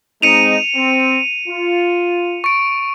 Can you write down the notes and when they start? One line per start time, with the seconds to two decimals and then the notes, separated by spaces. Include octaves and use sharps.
0.22 G#3 C4 D#4 C#7 D#7 F7
0.76 C4
1.48 F4
2.44 C#6 D7